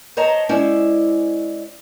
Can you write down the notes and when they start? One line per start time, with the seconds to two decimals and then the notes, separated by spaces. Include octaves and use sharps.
0.17 C5 C#5 D#5 A5 A#5
0.49 G#3 C#4 E4 C5 D5 E5